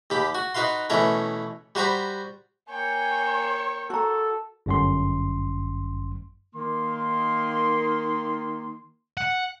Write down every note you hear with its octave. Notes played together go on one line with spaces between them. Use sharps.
D#2 G4 B5
F#4
D#4 F#4 B4 F5 C6
B2 E3 A3 C#4 A#4
G3 F#4 C5 A#5 B5
A#3 C#5 G5 G#5
F#4 A4 A#5
G1 F#2 C6
D#3 A#3 C6
F#5